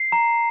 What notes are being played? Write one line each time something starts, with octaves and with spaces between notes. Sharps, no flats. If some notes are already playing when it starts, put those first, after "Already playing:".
Already playing: C7
A#5